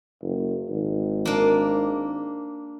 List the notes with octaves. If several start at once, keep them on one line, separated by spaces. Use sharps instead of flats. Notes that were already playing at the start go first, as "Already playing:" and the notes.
F#1
G#1
A#3 D4